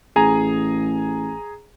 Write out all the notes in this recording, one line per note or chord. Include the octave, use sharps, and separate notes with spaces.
A1 G#4 G#5 A#5